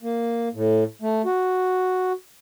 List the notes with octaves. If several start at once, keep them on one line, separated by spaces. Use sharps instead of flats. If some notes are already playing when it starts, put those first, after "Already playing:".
A#3
A2
A3
F#4